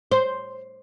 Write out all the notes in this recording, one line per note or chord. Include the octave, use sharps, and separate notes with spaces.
C5